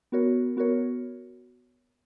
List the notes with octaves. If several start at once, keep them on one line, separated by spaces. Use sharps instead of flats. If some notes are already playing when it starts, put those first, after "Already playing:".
B3 F#4 A#4 C#5
B3 F#4 A#4 C#5